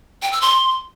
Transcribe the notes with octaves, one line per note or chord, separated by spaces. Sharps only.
G5
E6
C6